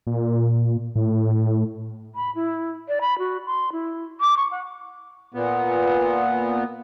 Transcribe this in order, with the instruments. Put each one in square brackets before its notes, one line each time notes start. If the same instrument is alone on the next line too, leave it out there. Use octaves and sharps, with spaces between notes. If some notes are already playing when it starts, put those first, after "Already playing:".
[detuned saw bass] A#2
A2
[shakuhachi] B5
E4
D5
B5
F#4
C6
E4
D6
C#6
F#5
[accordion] A#2 B3